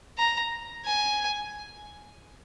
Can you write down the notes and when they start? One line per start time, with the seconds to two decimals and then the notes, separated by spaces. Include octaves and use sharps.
0.18 A#5
0.86 G#5